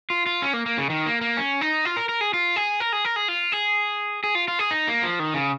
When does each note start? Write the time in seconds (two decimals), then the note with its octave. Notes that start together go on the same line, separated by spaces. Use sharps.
0.10 F4
0.26 F4
0.42 C#4
0.54 A#3
0.66 A#3
0.78 C#3
0.90 D#3
1.06 A#3
1.21 A#3
1.37 C#4
1.61 D#4
1.85 F4
1.97 A#4
2.09 A#4
2.21 G#4
2.33 F4
2.56 G#4
2.80 A#4
2.93 G#4
3.05 A#4
3.16 G#4
3.28 F4
3.52 G#4
4.24 G#4
4.35 F4
4.48 F4
4.59 G#4
4.71 D#4
4.87 A#3
5.03 F3
5.19 D#3
5.34 C#3